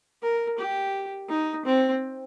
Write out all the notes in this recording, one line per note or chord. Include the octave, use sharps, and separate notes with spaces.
A#4
G4
D#4
C4